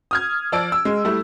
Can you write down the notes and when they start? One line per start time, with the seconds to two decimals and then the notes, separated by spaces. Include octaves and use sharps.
0.11 D#6 F6 G#6
0.52 F3 D5 E6 D7
0.72 E6
0.85 G#3
1.05 G3 A3 E4